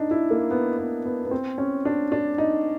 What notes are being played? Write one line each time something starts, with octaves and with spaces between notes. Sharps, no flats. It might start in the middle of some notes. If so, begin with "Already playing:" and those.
Already playing: D4 D#4
E4
A#3
B3
B3
B3
B3
C4
C#4
D4
D4
D#4